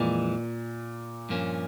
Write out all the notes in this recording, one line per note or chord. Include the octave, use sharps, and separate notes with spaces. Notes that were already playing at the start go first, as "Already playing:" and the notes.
Already playing: F2 A#2 E3 G#3
G2 F3 A#3 C#4